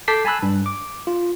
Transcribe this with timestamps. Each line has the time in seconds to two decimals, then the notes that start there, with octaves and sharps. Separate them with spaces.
0.08 A4 A5 D6 G6 B6 C7
0.25 G#5 A5 B5 E6 F#6
0.43 G2
0.66 D6
1.07 F4